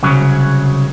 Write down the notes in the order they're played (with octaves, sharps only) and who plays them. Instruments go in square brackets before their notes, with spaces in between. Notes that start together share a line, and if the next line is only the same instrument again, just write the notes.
[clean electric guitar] C2 C#3 F#3